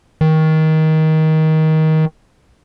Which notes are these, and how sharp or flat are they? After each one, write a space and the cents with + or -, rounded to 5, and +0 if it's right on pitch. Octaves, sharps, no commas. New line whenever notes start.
D#3 +20